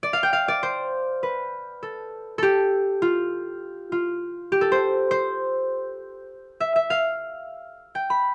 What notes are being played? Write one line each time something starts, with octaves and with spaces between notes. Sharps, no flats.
D5
F5
G5
F5
D5
C5
B4
A4
G4 A4
F4
F4
G4
A4
C5
C5
E5
E5
F5
G5
B5